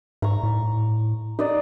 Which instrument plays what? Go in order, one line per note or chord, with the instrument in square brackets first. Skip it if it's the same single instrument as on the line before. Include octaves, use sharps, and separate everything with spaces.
[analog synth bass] G#2 [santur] A#5 C#6
[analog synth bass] A2
[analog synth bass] D#4 [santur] D5 D#5